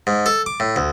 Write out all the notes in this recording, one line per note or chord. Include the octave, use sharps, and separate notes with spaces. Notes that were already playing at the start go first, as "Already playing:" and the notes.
G#2
A4
D6
A2
D2